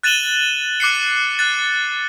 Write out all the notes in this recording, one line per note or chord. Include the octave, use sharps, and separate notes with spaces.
F#6 A6 D#7 E7 F#7 G7
D6 F#6 C7 C#7
F#6 A6